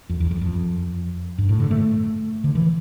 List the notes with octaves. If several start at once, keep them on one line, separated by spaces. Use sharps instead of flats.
F2
E2
F2
F2
G2
A2
D3
A3
D3
E3